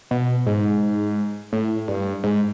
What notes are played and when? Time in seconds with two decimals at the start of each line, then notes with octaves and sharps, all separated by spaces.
0.11 B2
0.46 G#2
1.53 A2
1.88 G2
2.24 G#2